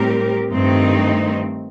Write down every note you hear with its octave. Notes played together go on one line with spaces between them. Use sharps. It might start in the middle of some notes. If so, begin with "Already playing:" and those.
Already playing: A2 G3 C4 G4 A#4
G2 D#3 A3 C4 D#4